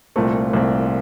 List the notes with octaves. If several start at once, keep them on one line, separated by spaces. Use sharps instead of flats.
C2 A#2 A3 C4
C2 A#2 A3 C4